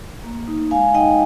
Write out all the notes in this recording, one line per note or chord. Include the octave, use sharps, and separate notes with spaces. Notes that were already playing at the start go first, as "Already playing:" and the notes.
A#3
D#4
G#3 F5 G#5
D#4 D#5 G5